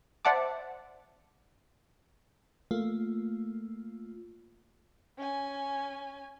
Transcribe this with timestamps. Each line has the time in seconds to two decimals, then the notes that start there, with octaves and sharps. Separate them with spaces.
0.25 C5 D5 E5 F#5 A5 D6
2.71 A3 A#3 F4
5.17 C#4 G#5